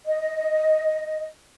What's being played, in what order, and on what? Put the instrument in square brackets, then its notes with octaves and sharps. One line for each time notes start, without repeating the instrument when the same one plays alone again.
[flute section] D#5